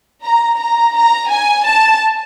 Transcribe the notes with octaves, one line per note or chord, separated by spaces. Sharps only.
A#5
A#5
A#5
G#5
A5